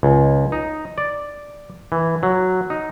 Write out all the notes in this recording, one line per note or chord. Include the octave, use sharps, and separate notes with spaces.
C#2
D#4
D5
E3
F#3
D#4